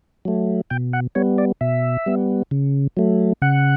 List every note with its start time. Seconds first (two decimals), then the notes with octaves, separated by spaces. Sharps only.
0.25 F#3 A3
0.70 B2 G5
0.93 F#5
1.15 G3 B3 C#5
1.38 D5
1.61 B2 E5
2.06 G3 B3
2.51 C#3
2.97 F#3 A3
3.42 C#3 F#5